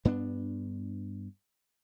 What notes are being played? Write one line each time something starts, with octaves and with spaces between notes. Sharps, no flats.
G2 B3 C4 D4